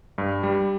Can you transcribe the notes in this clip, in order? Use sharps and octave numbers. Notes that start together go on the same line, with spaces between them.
G2
G3